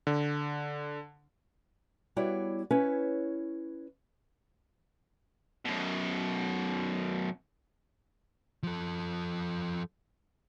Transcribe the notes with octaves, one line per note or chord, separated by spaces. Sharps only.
D3
G3 B3 E4 F#4 C#5 D5
C#4 E4 B4 C#5
F#2 B2
F3 A4